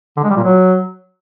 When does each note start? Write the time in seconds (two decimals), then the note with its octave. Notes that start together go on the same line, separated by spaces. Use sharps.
0.17 D3
0.23 G#3
0.30 G3
0.37 A#2
0.43 F#3